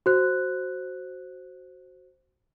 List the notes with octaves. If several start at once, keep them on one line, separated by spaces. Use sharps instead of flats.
F#4 C5 F#6